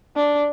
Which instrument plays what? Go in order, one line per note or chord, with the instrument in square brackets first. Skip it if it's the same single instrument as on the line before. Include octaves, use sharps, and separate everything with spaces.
[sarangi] D4